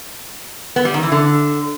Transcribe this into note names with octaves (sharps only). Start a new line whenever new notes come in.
B3
G3
D#3
E3
D3